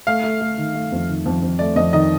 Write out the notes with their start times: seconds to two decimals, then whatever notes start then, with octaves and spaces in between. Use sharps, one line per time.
0.07 A3 F5
0.24 A3
0.41 A3
0.58 D#3
0.74 A3
0.92 F2
1.09 D#3
1.26 F2
1.42 F2
1.59 A3 D5
1.76 F2 D#5
1.93 D#3 D#5